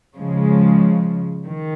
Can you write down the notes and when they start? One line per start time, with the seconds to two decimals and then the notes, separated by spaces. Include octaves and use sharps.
0.16 C#3 F3 G#3
1.45 D#3